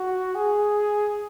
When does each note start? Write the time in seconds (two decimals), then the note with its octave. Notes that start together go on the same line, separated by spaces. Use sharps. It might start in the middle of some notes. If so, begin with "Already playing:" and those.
Already playing: F#4
0.35 G#4